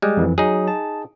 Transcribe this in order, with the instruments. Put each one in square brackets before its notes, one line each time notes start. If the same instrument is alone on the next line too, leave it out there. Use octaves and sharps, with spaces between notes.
[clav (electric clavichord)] G3 G#3
[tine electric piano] F2 E3
[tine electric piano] F#3 [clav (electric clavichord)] D#4 G#4
[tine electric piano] A5